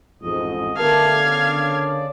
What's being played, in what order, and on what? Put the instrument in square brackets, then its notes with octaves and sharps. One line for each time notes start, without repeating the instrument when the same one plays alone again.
[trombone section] A1 F2 G#2 [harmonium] D#5
[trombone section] D3 [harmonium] A3 G4 [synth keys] B3 A#4 A5 [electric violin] F5 G#6
[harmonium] C#3 D5